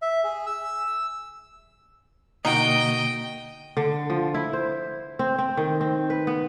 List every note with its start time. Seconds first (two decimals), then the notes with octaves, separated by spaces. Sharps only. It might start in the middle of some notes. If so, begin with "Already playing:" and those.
0.02 E5
0.24 G#4
0.46 E6
2.45 B2 D3 A#3 D#4 F#4 D#5 G5
3.77 D3
4.10 F3
4.34 E4
4.53 C5
5.19 C4
5.39 C4
5.57 D#3
5.81 C4
6.10 B4
6.27 B3